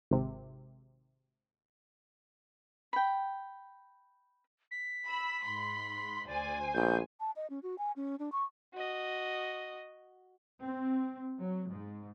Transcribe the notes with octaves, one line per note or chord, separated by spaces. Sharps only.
G#1 C3
G5 B5
B6
B5 E6
G#2 B5 C6
D2 C5 D5 G#5
A#1 G6
A5
D#5
C#4
F#4
G#5
C#4
D4
C#6
F#4 D#5
C4
F#3
G#2